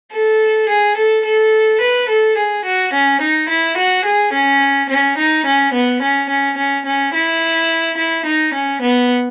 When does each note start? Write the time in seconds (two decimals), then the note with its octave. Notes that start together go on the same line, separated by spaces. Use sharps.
0.12 A4
0.69 G#4
0.97 A4
1.25 A4
1.81 B4
2.09 A4
2.37 G#4
2.65 F#4
2.93 C#4
3.21 D#4
3.49 E4
3.77 F#4
4.05 G#4
4.33 C#4
4.90 C#4
5.18 D#4
5.46 C#4
5.74 B3
6.02 C#4
6.29 C#4
6.58 C#4
6.86 C#4
7.14 E4
7.98 E4
8.26 D#4
8.54 C#4
8.82 B3